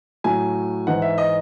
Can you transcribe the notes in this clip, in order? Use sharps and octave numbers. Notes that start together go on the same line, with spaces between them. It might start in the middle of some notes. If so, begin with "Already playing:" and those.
A2 F#3 G#5
G#2 E3 F#5
E5
D#5